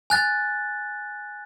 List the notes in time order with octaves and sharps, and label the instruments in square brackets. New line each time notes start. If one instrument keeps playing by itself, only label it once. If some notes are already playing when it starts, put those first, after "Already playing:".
[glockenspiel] G#5 F#6 A6